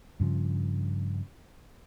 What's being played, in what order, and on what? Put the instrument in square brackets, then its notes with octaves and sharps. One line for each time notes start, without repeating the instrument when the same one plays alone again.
[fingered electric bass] G2 C#3 F3